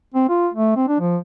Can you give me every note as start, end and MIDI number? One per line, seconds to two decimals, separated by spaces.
0.14 0.26 60
0.29 0.49 65
0.54 0.75 57
0.76 0.85 60
0.88 0.99 62
1.00 1.17 53